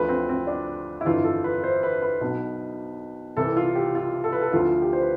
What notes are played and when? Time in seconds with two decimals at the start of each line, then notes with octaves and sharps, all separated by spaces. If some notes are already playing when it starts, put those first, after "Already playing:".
Already playing: D2 D3 F3 B4
0.09 C4
0.29 C4
0.47 D4
1.01 E4
1.06 G1 F2 E3 F4
1.24 A4
1.44 B4
1.64 C5
1.83 B4
2.02 B4
2.21 B1 B2
3.37 C2 C3 E3 A4
3.57 F4
3.75 G4
3.95 F4
4.24 A4
4.33 B4
4.41 A4
4.53 D2 D3 F3 F4
4.82 G4
4.93 C5
5.01 B4